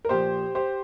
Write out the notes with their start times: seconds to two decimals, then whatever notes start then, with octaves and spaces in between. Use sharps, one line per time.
0.05 A#4
0.09 A#2 F3 G4 C5
0.55 G4 C5